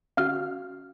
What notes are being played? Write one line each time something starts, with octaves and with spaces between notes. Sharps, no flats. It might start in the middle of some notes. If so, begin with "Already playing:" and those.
C#4 F#4 F5 F6